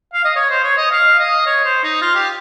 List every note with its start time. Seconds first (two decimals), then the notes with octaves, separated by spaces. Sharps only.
0.14 F5
0.25 D#5
0.36 C#5
0.50 C5
0.64 C#5
0.77 D#5
0.91 F5
1.19 D#5
1.46 C#5
1.65 C5
1.84 D#4
2.02 F4
2.15 G4